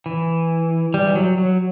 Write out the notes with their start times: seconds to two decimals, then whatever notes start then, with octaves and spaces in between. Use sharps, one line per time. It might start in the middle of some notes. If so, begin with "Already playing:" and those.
0.06 E3
0.94 G3
1.07 E3
1.15 F#3
1.38 F#3